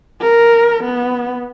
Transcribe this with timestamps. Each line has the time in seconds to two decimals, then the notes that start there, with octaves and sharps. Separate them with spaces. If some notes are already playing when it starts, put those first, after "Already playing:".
0.22 A#4
0.84 B3